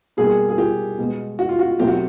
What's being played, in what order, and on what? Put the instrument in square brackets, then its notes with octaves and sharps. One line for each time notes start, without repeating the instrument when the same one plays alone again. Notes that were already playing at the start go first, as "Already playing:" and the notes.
[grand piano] B2 G3 A#3 G#4
G#4
G4
B2 G#3 B3
F#4
F4
F#4
B2 F#3 A3 C4 G4
F#4